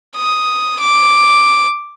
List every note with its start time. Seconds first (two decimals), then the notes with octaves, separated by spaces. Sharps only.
0.16 D#6
0.80 D6